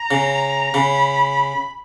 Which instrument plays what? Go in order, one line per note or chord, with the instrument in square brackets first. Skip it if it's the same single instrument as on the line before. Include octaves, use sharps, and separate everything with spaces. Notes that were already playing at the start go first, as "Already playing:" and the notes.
Already playing: [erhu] A#5
[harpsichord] C#3
[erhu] A#5
[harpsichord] C#3 [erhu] B5